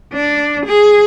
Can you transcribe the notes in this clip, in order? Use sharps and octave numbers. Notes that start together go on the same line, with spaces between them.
D4
G#4